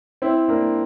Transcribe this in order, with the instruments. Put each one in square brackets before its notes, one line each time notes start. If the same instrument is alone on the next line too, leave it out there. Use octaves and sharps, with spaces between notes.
[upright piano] C4 E4
A#3 D4